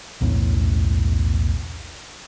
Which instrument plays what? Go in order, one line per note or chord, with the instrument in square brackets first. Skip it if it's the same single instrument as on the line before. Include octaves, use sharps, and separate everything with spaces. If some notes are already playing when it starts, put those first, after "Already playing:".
[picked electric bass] B1 E2 A2 C#4